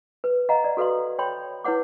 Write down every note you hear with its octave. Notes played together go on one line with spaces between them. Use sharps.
B4
D#5 F5 F#5 A#5
D5
F#4 A4 B4 F5 C6
C#5 G5 B5 C6
E4 B4 C#5 F#5 D6